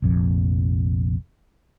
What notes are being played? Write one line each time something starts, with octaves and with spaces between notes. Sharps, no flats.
F1 A#1 F2